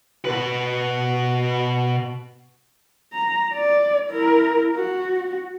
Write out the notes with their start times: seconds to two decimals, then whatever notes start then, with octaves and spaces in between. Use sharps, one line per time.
0.25 B2 B4
3.13 A#5
3.53 D5
4.10 E4 A#4
4.75 F#4